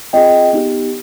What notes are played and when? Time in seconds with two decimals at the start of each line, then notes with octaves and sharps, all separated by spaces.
0.13 C4 F4 G#4 D#5 G5
0.53 B3 D#4 G4